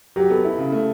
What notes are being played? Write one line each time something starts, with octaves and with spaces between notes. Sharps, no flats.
F#3 G4
B3 A4
E4
C#3
A3